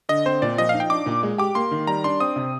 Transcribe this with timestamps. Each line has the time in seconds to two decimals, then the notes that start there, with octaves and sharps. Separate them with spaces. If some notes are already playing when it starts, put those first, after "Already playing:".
0.09 D3 D#5
0.25 C4 C5
0.42 A#2 D5
0.58 F3 D#5
0.69 F5
0.74 D#4
0.80 G5
0.90 D4 D6
1.06 A#2
1.23 G#3
1.38 G4 D6
1.55 A#3 C6
1.71 D#3
1.87 G3 A#5
2.04 D4 C6
2.20 C4 D#6
2.36 C3